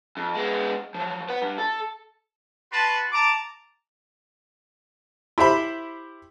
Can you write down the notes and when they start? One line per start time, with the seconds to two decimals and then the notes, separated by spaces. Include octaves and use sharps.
0.17 F2
0.35 G#3 B3
0.94 F3 F#3
1.29 B4 F#5
1.42 G2
1.58 A4
2.72 F#4 B4 A5 C6
3.12 A5 A#5 D6
5.38 E4 G4 C5 E5 B5